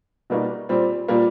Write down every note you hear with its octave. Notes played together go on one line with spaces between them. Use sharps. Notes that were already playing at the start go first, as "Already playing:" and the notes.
B2 G3 A#3 D#4 F#4
A#2 G3 C4
A#2 G3 A#3